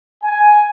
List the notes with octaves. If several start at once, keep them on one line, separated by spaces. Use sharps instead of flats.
G#5